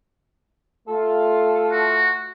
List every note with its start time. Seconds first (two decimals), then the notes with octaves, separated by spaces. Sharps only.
0.88 A3 F4 A4
1.72 F#4